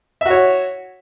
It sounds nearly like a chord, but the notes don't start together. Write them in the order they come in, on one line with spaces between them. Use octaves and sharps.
E5 F#4 C#5